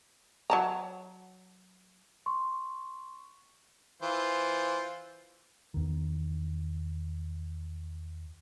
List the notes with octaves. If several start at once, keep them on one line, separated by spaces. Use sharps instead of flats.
F#3 A5 A#5
C6 C#6
E3 F4 C5
E2 D#3